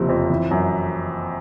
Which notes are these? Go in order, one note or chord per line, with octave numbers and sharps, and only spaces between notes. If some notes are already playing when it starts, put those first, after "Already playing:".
Already playing: F#1 C3 F3
F2
E3
F#2